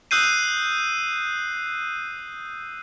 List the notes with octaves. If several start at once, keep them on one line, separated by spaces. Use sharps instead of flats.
D#6 E6 F#6 G6 C7 D#7